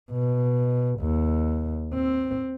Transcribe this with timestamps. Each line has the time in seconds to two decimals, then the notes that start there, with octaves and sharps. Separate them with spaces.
0.12 B2
1.00 D#2
1.94 C4